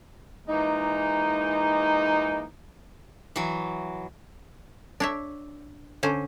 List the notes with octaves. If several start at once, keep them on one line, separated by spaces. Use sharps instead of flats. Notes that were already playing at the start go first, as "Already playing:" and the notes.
E3 G#3 A#3 D#4
E3 F#3
D4 C#5 E5
D3 C#4 C5